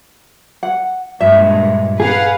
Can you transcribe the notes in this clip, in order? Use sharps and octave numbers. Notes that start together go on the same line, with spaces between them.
F#5
G2 A#2 G#3 E5
G#4 B4 F5 F#5